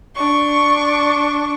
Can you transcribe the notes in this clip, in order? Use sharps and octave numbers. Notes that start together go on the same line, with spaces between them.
D4 C#6